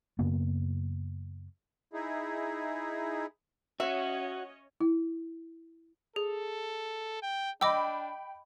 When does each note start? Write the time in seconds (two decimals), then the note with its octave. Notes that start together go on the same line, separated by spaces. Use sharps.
0.19 F#2 C#3 A#3 B3
1.93 D#4 E4 G#4
3.80 C#4 F#4 C#5 D#5 E5
4.81 E4
6.16 G#4 A4
7.23 G5
7.61 D4 D#5 G5 B5 D6 E6